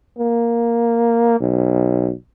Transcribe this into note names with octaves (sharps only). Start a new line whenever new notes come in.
A#3
B1